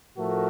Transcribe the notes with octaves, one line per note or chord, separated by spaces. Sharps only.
A2 F3 A3 F#4 A#4